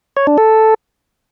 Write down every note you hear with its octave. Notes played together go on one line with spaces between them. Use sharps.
C#5
D4
A4